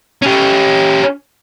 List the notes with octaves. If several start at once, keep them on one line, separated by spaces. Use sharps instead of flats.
C#4 G4